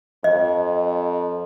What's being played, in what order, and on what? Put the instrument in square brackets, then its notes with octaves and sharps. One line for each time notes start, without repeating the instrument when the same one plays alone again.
[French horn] F2 [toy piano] D#5